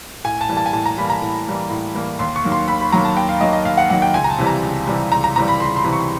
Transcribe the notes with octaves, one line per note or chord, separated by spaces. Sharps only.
A2 G#5
A5
E3 G3 A#3
A5
G#5
A2 A5
A#5
E3 G3 A#3 B5
A#5
A2
E3 G3 A#3
A2
E3 G3 A#3
D#2 C6
C#6
D#3 F#3 A#3
C6
D#2 B5
B5
D#3 F#3 A#3 A#5
A5
D#2 G5
F5
D#3 F#3 A#3 D#5
D#5
D#2 F5
F#5
D#3 F#3 A#3 F#5
G5
C#2 G#5
A#5
A5
C3 E3 G3
A#5
C#2
C3 E3 G3
C#2 A#5
A#5
C3 E3 G3 A#5
B5
C#2 C6
C6
C3 E3 G3
C#6